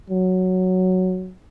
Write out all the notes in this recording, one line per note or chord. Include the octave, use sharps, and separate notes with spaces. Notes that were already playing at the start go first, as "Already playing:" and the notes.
F#3